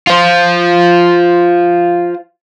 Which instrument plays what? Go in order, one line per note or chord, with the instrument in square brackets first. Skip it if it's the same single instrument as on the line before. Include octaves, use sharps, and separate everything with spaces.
[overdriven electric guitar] F4 C5